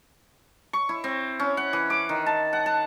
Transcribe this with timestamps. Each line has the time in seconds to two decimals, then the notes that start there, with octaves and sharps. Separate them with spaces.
0.73 C#6
0.89 E4
1.04 C4
1.40 C#4
1.57 F#5
1.73 E3
1.90 D6
2.09 D#3
2.26 A5
2.53 F#5
2.66 A5